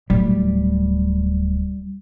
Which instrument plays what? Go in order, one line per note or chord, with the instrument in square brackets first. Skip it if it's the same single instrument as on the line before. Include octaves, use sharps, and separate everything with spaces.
[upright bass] D1 [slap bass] G3